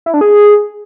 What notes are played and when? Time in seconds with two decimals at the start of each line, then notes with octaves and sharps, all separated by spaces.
0.06 E4
0.14 D4
0.21 G#4